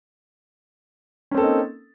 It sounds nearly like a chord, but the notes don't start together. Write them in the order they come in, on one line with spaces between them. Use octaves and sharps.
C#4 C4 A4 A#3 D#4